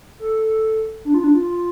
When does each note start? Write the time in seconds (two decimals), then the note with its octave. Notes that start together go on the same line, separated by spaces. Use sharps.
0.19 A4
1.05 D4
1.14 F4
1.24 D4
1.34 F4